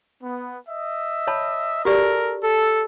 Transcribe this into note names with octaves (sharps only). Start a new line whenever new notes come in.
B3
D#5 E5
C#5 A5 B5
F#4 G4 A4 A#4 D5
A4